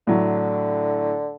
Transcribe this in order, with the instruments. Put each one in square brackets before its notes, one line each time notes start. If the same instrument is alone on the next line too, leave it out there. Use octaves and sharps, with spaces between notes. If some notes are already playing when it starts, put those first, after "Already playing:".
[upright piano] A2 F#3 [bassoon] D3